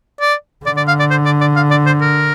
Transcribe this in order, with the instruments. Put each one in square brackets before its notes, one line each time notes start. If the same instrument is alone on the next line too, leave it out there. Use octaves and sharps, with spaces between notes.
[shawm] D5
[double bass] D3 [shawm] D5
[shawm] D5
F5
D5
C5
D5
D5
F5
D5
C5
A#4